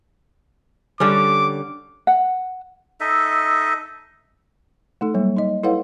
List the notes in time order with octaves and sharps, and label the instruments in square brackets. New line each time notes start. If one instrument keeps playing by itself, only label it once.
[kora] D3 G3 C#4 [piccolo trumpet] D6
[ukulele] F#5
[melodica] D#4 A4 D#5 E5
[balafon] A3 D#4 A4
F#3 G3 A#3
D#4 D#5
E4 A4 B4 C#5 F5 F#5